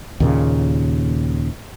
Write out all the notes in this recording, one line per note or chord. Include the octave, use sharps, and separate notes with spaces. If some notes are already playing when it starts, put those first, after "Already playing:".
D#2 A#2 C#3